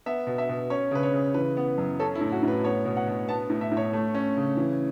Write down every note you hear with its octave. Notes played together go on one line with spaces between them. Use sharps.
B3 E5
B2
E5
B2
C#4 C#5
C#3 B4
C#5
C#3
E3 B4
B3
F#2
C#4 A4
E4
A2
F#4
A2
B4
B3 C#5
B2
F#5
B2
B3 A5
A2
E5
A2
C#5
A3
C#4
C#3
E3